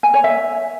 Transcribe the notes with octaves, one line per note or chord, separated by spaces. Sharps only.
G#5
C#5
E5